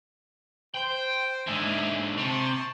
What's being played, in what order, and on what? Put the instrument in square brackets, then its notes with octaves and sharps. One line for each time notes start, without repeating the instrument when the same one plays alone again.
[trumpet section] C5 [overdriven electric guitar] G5
[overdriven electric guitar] G#2 D3 [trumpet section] D#5 E5 G#5
[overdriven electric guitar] C3 [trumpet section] A5 C#6